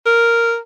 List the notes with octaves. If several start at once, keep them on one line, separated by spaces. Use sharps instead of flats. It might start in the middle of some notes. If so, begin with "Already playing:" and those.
A#4